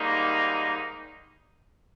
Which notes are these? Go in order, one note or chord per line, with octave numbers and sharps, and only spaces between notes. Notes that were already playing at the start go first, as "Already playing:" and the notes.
Already playing: G#2 D#3 G3 A#3 D#4